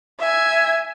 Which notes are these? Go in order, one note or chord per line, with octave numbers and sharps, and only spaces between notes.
E5 G#5